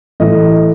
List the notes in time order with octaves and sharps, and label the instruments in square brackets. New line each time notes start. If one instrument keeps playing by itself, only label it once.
[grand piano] A2 E3 D#5